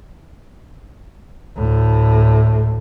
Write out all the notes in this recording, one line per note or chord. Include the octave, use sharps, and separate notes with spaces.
D2 A2